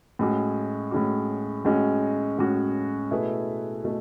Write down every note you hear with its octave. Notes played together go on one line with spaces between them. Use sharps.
A2 G#3 C#4 F#4
A2 G#3 C#4 F#4
A2 G#3 C#4 F#4
A2 G#3 C#4 F#4
B2 A3 E4 G#4 B4
B2 A3